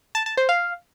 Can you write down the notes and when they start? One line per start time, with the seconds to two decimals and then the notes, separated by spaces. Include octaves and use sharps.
0.15 A5
0.26 A5
0.37 C5
0.49 F5